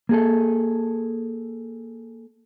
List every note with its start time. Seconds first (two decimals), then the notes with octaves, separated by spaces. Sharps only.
0.09 A#3 G#4 A4